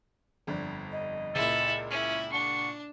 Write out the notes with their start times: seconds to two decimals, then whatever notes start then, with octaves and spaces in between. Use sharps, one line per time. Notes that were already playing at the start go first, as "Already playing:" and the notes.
0.47 G1 F2 D4
0.92 D#5
1.35 C#2 A#2 E4 A4
1.91 C#4 E4
2.32 D4 F#5 C#6